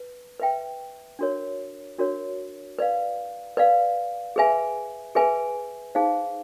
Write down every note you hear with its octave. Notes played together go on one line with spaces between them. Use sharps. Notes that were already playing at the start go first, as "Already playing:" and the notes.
Already playing: B4
B4 E5 G5
D4 F#4 A#4 C#5
D4 F#4 A#4 C#5
B4 D5 F5
B4 D5 F5
G#4 B4 E5 G#5
G#4 B4 E5 G#5
D#4 G#4 C5 F5